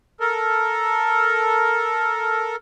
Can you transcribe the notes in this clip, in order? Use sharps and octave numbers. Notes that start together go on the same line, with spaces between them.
A4 A#4